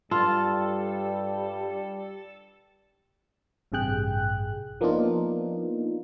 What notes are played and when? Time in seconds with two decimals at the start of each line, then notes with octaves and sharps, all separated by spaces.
0.11 G2 G3 F4 A4
3.72 A1 G2 C3 G#4 G5 F#6
4.81 F3 A#3 B3 D4 D#4 F4